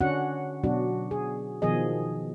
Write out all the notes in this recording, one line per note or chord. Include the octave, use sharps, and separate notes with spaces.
D3 C#4 D4 F#4 F#5
B2 F#3 D4 F#4
G#4
B2 D#3 F3 G#4 D#5